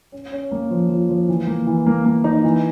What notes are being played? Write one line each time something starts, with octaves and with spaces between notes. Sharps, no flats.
C#4
C#4
A#3
F3
F3
F3
E3
A#3
E3
A#3
A#3
D#4
E3